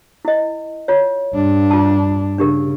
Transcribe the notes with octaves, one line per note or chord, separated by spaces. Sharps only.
E4 D#5
F4 C#5
G2 D4
F4 A5
C#3 D4 G4 A#4